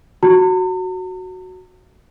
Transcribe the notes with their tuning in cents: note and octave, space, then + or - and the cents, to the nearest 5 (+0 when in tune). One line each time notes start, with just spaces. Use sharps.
F#4 +0 A#5 -45